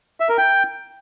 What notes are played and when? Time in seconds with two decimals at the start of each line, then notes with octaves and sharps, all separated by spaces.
0.20 E5
0.29 A#4
0.38 G5